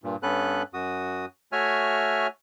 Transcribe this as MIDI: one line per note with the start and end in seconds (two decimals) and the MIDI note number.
0.04 0.16 43
0.04 0.16 46
0.23 0.63 43
0.23 0.63 59
0.23 0.63 61
0.23 0.63 69
0.23 0.63 71
0.23 0.63 90
0.74 1.25 42
0.74 1.25 66
0.74 1.25 87
1.52 2.27 57
1.52 2.27 66
1.52 2.27 73
1.52 2.27 76
1.52 2.27 80
1.52 2.27 89